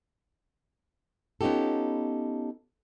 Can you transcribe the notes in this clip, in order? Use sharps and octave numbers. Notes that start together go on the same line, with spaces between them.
B3 C#4 D#4 F4 G4 A4